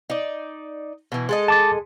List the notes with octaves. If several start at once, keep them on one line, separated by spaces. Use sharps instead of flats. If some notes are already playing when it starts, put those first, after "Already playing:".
D#4 D5
B2 E3
G#3 A4 D#5
A5 D6 A6